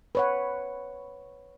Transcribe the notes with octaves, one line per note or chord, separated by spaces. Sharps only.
B4 C#5 F#5